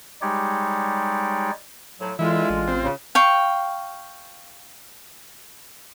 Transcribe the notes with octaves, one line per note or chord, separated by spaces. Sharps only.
G3 G#3 D#4 G4 C#5 D5
A2 F3 F#3
D3 E3 G#3 E4 F4
A1
C4
C#3
F5 G5 C#6